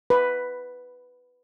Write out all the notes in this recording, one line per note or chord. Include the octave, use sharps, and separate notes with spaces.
B4